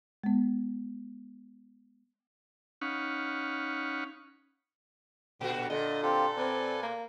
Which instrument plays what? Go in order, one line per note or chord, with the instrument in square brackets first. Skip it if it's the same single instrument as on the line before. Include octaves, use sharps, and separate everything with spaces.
[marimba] G#3 B3
[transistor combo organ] C#4 D#4 F5 F#5 B5 C#6
[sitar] A#2 F#4 [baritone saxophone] D3 [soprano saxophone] G4
[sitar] A#2 [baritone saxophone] D3 [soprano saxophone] D#5
[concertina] C4 F4 G4 [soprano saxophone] A4
[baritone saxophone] C4 [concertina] B4 D5 G#5
[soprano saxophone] A#3